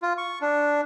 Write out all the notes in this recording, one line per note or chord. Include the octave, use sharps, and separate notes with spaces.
F4
C#6
D4